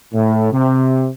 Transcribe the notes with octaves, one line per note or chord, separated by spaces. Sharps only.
A2
C3